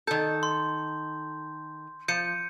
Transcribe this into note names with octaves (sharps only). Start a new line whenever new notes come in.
D#3 A4 G6
C6
F3 G6 C#7 D#7